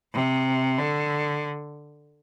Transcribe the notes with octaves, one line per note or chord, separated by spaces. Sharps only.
C3
D3